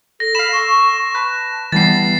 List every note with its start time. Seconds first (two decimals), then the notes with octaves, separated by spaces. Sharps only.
0.20 A4 A#6
0.35 F5 B5 E7
0.52 C6 C#6 E6
1.15 B4 A5
1.72 E3 G3 B3 A6 C7